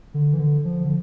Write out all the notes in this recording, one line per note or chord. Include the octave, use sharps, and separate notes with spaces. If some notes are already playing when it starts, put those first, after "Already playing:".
D3
E3
D3
F3
D3